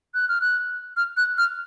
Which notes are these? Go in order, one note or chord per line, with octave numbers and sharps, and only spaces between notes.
F#6
F6
F#6
F6
F#6
F6